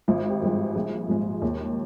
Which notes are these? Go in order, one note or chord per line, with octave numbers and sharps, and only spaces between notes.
G#1 F4
G4
G2 F3 G#3
A#1 G#4
G#2 F3 G#3
D#2